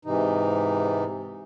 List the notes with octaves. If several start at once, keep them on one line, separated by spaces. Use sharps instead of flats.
G#2 C3 E3 D#4